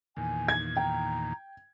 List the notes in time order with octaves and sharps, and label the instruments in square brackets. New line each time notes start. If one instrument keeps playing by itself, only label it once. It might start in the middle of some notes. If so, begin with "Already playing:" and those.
[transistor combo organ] E2 A#2 D#3 [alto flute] G#5
[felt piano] G#6
[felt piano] G5 [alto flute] A#5